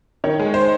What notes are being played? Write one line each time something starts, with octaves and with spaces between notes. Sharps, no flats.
D#3 C#5
G#3
C5